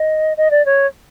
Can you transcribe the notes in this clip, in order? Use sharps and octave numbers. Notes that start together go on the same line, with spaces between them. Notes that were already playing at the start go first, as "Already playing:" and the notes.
Already playing: D#5
D#5
D5
C#5